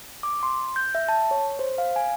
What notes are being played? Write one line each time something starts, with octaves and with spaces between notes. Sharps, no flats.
D6
C6
G6
E5
A5
C#5
C5
F5
G#5